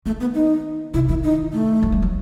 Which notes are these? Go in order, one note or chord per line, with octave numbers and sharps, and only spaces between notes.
D#3 A3
B3
D#4
C3 E4
D#3 E4
D#4
A3
F#3
G3
F#3